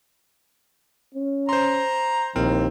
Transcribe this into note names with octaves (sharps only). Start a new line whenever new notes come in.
C#4
C5 A#5 C6
A#1 D#2 C4 E4 A#4